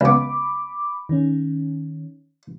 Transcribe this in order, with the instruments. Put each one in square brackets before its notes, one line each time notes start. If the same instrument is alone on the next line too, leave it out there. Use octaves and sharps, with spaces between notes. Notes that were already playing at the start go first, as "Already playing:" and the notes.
[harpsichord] C#2 B3 [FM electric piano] B5 D6
[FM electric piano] D#3 C#4